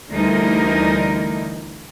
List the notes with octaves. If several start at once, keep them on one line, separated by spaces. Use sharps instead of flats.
D2 D3 E3 G3 D#4 A#4